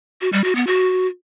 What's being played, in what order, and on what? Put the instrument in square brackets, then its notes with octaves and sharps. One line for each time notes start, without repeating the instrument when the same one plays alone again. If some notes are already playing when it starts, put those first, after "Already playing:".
[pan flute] F#4
G3
F#4
B3
F#4